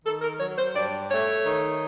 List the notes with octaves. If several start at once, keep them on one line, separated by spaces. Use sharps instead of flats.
D#3 A4
A#4
F#3 C#5
C5
G2 D5
A3 C#5
D#3